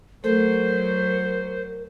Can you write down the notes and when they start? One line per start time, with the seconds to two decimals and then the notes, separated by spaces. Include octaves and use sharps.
0.24 F#3 A3 A4 A#4 C5